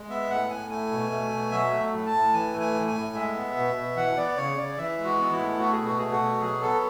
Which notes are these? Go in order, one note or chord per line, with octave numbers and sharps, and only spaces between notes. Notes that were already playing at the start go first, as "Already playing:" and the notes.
Already playing: G#3
B3 E5
A2 F#5
A2 G#5
A3 G#5
B2
A3
B2
F#3 E5
A3
A2
A5
A2
E3 G#5
A3
G#5
A2
G#5
A2
G#3 E5
B3
B2
B2
E3 F#5
B3 D5
C#3 C#5
C#3 D5
E3 E5
G#3
F#4
B3
E4
A2
A3 F#4
G#4
B2
F#4
A3 G#4
F#4
B2
F#3 G#4
B3 A4